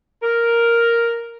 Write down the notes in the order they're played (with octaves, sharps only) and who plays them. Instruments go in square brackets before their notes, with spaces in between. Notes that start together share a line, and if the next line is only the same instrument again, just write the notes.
[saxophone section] A#4